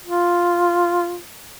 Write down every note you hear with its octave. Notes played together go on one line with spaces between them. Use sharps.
F4